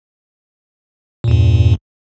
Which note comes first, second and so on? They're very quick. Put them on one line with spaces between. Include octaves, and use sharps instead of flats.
A#2 E2 G2